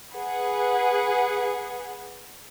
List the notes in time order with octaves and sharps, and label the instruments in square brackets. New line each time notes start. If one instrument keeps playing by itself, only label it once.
[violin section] G#4 B4 F#5